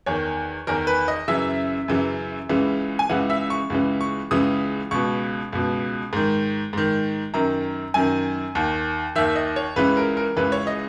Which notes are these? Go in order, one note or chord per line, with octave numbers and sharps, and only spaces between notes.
E2 D#3 C#5
E2 D#3 A#4
B4
D#5
F#2 C#3 E3 E5
F#2 C#3 E3
C#2 C#3 E3
G#5
C#2 C#3 E3 F#5
E5
C#6
C#2 C#3 E3
C#6
C#2 C#3 E3 D#6
C#2 B2 C#6
C#2 B2
G#2 D#3
G#2 D#3
F#2 D#3 A#5
F#2 D#3 G#5
D#2 D#3
D#2 D#3 E5
D#5
C#5
C#2 C#3 E3 B4
A#4
A#4
C#2 C#3 E3 B4
C#5
D#5